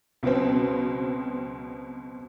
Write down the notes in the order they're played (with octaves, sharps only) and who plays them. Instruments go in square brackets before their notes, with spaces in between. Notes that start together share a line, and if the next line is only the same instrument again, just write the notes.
[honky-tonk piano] C#2 B2 F#3 B3 C4